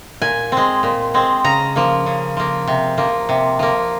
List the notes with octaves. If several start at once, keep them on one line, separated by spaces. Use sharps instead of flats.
A#2 G#5
G#3 C4
A#2
G#3 C4
C#3 A#5
F3 A#3
C#3
F3 A#3
C3
F3 A#3
C3
F3 A#3